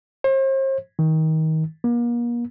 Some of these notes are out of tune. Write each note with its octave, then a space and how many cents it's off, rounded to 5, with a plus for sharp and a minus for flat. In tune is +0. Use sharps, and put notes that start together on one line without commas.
C5 +40
D#3 +25
A#3 +40